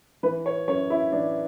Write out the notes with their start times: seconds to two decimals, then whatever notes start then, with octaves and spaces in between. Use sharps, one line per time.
0.23 E3 B4
0.46 C#5
0.68 F#2 C#5
0.90 E4
1.12 E3 D4